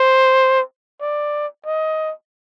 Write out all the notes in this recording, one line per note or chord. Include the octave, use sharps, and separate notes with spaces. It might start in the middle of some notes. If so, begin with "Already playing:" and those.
Already playing: C5
D5
D#5